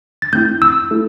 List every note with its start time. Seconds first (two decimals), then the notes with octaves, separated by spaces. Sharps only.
0.22 A6
0.33 A3 C4 E4 G6
0.62 E6
0.91 A3 E4 A4